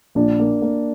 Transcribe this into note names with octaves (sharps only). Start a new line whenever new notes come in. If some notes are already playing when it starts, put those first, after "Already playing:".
A#1 D4
A#3
A#3